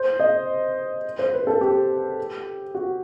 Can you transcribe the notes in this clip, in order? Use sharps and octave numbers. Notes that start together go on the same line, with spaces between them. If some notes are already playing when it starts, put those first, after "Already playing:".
Already playing: C5
D#5
C5
B4
A4
G4
F#4